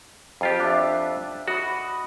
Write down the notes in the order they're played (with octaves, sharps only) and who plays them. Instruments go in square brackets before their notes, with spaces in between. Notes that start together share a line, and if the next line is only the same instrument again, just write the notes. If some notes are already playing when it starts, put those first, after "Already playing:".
[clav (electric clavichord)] F2 F4 G4
[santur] D4 E5
[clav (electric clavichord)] F#4 [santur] D#5 B5